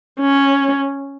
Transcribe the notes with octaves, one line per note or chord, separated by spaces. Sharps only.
C#4